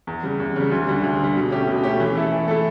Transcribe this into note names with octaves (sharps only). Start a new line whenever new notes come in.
E2
C#3 G3
E2
C#3 G3
D2
D3 G3
D2
D3 G3
B2
A3 C#4 G4
B2
A3 C#4 G4
E3
A3 E4 A4
E3
A3 E4 A4